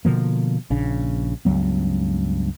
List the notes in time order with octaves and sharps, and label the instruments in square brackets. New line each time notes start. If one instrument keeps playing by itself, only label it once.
[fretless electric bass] B2 D3 F3 A#3
A#1 C#3 D4
C#2 G2 F#3 B3